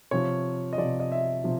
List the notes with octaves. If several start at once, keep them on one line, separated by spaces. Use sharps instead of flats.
C3 F3 C#5
D#5
C3 F3 D5
D#5
E5
C3 F3